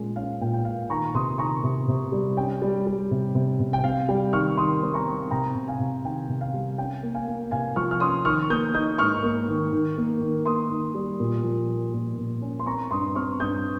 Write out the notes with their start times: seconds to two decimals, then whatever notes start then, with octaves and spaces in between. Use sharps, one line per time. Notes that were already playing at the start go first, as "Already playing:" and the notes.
Already playing: A#2 G#3 C#4
0.16 C#4 F5
0.41 A#2 G5
0.53 G5
0.65 A#2 F5
0.90 D#3 A#5 C#6
1.15 C3 C6 D#6
1.38 D#3 A#5 C#6
1.63 C3
1.88 C3
2.12 G3
2.37 C#4 G5
2.62 G3
2.87 G3
3.11 C3
3.35 C3
3.60 C3
3.73 G5
3.84 C4 F5
4.09 G3 G5
4.33 D#3 C#6 F6
4.57 D#3 C6 D#6
4.83 C4
4.94 A#5 C#6
5.06 C4
5.31 C3 G5 A#5
5.55 C3
5.68 F5 G#5
5.80 C3
6.04 D#3 G5
6.29 C3
6.41 F5
6.54 G3
6.78 C#4 G5
7.03 A#3
7.14 F5 G#5
7.28 A#3
7.51 C3 F5 G#5
7.76 F3 C#6 F6
7.91 F6
8.00 C#4 C6 D#6
8.25 D#3 C#6 F6
8.50 A#3 D#6 G6
8.74 D#4 D#6 G6
8.98 G#2 C#6 F6
9.23 A#3
9.49 D#3
9.73 D#3
9.98 A#3
10.21 D#3
10.45 A#3 C6 D#6
10.70 D#3
10.94 G3
11.20 A#2
11.44 F3
11.68 A#3
11.94 A#2
12.18 A#2
12.42 C#4
12.59 C6
12.66 C4 A#5 C#6
12.91 G2 C6 D#6
13.15 C4 C#6 F6
13.40 G2 D#6 G6